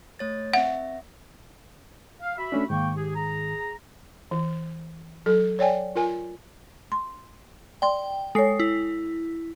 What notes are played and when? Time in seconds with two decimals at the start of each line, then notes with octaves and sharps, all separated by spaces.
0.19 A3 C#5 A6
0.54 C4 E5 F#5
2.22 F5
2.38 F#4 E5 B5
2.52 A3 C#4 D4
2.70 G#2 D#3 A#3 G5 C#6
2.96 G4 G#4
3.15 G#4 A#5
4.31 E3
5.26 F#3 A4
5.59 C#5 D5 G5 G#5
5.96 F4 A#4 G#5
6.92 C6
7.82 D5 G5 C6
8.35 G#3 A4 C#5 C7
8.59 E4